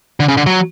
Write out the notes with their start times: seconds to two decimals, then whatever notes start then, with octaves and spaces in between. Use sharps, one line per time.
0.20 D3
0.28 C#3
0.37 D3
0.46 F#3